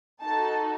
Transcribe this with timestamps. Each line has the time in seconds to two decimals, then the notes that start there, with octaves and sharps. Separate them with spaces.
0.22 D#4 F#4 A4 A5